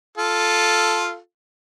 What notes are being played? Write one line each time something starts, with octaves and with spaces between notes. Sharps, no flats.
F4 A4